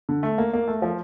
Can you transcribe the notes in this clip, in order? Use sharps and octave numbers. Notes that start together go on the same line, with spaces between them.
D3
A3
A#3
A#3
A3
F3